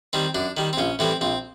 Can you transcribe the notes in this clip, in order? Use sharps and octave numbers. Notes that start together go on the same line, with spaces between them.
D#3 G3 C4
F#2 D4
D#3 G3
C4
A#1 C#4
A2 E3 G3 C4
A#1 C4